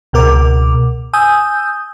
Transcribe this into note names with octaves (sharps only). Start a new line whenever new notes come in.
C#2 B2 A#4 D6
G#5 D#6 E6 G6